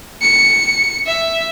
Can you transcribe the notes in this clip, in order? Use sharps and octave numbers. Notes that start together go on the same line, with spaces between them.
C#7
E5